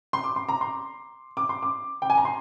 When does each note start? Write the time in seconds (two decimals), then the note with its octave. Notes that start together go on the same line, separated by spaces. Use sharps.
0.13 C6
0.24 D6
0.36 C6
0.49 A#5
0.61 C6
1.37 D6
1.49 C6
1.63 D6
2.02 G5
2.10 G#5
2.17 A#5
2.25 C6